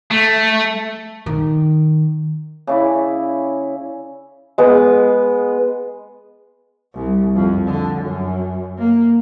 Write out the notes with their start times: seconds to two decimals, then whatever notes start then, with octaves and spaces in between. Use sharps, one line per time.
0.11 A3
1.26 D#3
2.67 C#3 E4 D5
4.58 G#3 B3
6.94 C2
7.35 F2
7.67 D3
8.02 F#2
8.78 A#3